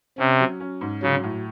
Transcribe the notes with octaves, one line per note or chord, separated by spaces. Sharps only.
C3 C#4
F#3
C#4
G#2
C#3 F#3
A2